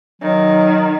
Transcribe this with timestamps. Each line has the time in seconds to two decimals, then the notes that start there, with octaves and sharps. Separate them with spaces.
0.22 D#3 F#3